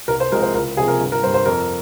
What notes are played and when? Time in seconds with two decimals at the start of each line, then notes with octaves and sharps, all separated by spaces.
0.08 C2 A#4
0.20 C5
0.31 C3 F3 G#3 A#4
0.42 C5
0.54 C#2 A#4
0.77 C3 F3 G#4
0.88 A#4
1.00 G1
1.12 A#4
1.23 G3 C5
1.27 G2
1.34 C5
1.46 F2 A#4